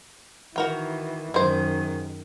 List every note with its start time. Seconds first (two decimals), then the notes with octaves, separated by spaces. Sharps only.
0.56 D#3 E3 F#4 A#4 G5
1.34 F#2 D#3 G#3 C5